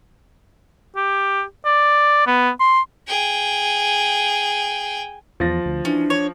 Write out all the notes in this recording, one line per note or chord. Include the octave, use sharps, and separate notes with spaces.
G4
D5
B3
C6
G#4 G5
E2 F3 A6 A#6
D2
E3 C#4 D4
C#5